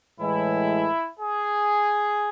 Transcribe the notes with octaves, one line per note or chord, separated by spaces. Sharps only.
A2 E3 G#3 E4
G#4